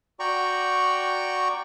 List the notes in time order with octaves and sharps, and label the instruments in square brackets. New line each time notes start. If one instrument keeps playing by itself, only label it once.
[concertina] F#4 D5 G5 A#5 C#6